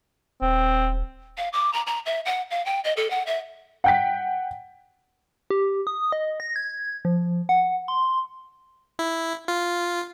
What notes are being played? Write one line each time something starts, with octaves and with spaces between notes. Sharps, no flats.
D#1 C4
F5
D6
A#5
A#5
E5
F#5
F5
G5
D#5
A4
F#5
E5
F#5 G5 B6
G4
D#6
D#5
A#6
G#6
F3
F#5
C6
E4
F4